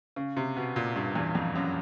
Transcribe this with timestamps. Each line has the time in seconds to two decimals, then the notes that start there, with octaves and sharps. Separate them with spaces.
0.16 C#3
0.37 C3
0.57 B2
0.76 A#2
0.96 G2
1.15 E2
1.35 F2
1.55 F#2